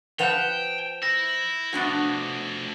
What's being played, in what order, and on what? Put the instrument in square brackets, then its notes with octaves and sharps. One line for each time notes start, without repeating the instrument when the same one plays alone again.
[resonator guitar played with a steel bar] F3 B4 F#5 [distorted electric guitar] G5 [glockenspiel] G6 E7 F7
[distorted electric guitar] E4 E5 [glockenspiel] A#6
[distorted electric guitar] F3 A3 [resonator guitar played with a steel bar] B3 D4 F#4